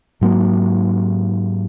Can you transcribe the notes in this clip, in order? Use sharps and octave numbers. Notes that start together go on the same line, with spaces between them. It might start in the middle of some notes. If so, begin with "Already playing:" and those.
G#2 F#3 A#3